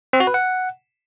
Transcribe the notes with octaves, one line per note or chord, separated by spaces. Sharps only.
C4
F#4
B4
F#5